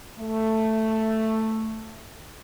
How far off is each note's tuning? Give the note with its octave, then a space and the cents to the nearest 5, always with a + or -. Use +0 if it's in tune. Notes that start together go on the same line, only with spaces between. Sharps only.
A3 +5